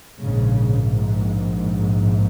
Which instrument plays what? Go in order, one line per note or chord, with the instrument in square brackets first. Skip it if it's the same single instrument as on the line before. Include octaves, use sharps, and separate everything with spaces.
[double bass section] A#1 G#2 C#3